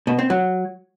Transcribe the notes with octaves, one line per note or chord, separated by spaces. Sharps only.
B2
C4
F#3